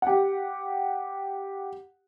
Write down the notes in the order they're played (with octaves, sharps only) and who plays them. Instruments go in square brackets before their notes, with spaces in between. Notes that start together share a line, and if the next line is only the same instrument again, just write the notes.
[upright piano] G4 F#5